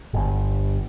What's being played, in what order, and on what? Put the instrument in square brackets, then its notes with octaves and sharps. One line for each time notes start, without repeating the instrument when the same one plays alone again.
[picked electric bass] G1